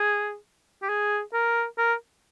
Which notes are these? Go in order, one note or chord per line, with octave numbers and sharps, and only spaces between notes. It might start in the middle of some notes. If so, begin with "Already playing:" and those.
Already playing: G#4
G4
G#4
A#4
A#4